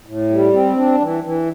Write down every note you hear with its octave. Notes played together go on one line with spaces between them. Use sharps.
A2
G3
C4
D4
E3
E3